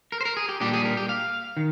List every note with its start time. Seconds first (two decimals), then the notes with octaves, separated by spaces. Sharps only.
0.12 A#4
0.21 C5
0.25 A#4
0.37 G#4
0.49 G4
0.60 A#2 G3 D4 G4
0.73 G#4
0.85 A#4
0.97 G4
1.09 F5
1.57 D#3